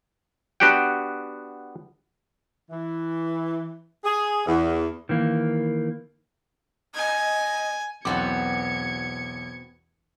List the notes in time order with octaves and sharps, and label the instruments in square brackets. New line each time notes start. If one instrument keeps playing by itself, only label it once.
[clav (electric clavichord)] B3 D4 F#4 G4 F#5 G5
[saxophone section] E3
G#4
E2
[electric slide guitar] D#3 E3 A#3
[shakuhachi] D#5 [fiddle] G#5
[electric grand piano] B1 E2 D6 [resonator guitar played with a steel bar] B2 B3 C4 [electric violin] G#6 C#7